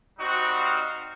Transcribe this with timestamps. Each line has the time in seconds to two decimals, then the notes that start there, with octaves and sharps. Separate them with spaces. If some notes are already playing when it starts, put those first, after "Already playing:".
0.18 G3 C4 D#4 F#4
0.57 F5